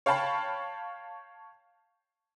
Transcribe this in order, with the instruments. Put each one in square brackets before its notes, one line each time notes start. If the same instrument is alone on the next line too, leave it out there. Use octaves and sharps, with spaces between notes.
[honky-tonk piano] C#5 F5 G5 A5 B5